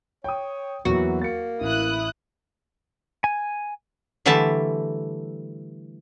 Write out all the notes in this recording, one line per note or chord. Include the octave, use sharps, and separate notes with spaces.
C#5 G5 D#6
E2 E3 F#3 A#3 F#4
A#3 A6 C#7
A1 E4 D#6 F#6
G#5
D3 E3 G3 A3 E5 A5